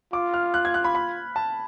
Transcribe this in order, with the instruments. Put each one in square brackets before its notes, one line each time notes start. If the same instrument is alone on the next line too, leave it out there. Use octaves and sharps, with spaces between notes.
[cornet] F4 [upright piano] D6
[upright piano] F6
F#6
G#6
F#6
B5
B5
A5